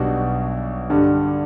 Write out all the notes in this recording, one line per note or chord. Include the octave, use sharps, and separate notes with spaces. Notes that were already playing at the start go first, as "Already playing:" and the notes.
Already playing: B1 B2 G3 D4 F#4
G2 D3 G3